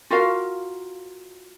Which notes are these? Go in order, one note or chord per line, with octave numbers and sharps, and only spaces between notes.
F4 F#4 A#4 F5